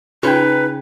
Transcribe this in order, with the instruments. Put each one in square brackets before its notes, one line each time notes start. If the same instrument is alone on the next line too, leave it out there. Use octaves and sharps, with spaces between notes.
[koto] C#3 [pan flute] D#4 [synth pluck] F4 G5 [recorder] B4